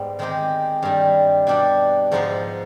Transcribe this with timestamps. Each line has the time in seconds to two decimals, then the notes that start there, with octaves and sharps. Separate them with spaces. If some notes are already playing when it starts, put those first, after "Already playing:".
Already playing: G#2 G3 B3
0.19 D#3 G#3 C4 D#4 G4
0.83 G2 D#3 G3
1.47 B2 G3 D4 G4 D5
2.12 G#2 F3 B3 D#4 B4